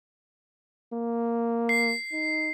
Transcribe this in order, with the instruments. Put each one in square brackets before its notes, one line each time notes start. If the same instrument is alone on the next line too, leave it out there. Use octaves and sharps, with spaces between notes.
[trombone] A#3
[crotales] C7
[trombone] D#4